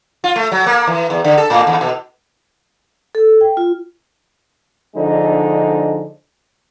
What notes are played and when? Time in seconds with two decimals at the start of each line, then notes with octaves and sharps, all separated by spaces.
0.24 F4
0.36 A3
0.52 F#3
0.66 A#3
0.87 E3
1.10 E2
1.24 D3
1.37 A4
1.50 A2
1.67 D#2
1.81 B2
3.15 A4
3.41 G5
3.57 F4
4.96 D3 F3 G#3 D4 D#4